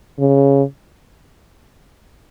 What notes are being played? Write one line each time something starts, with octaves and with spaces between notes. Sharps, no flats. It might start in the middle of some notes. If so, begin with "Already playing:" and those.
C#3